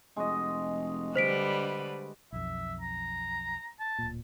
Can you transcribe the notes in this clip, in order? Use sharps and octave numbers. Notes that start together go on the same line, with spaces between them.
F1 G#3 F#4 D#5
D3 G3 B4 C5 B6 D7
B1 F2 E5
A#5
A5
D1 A#2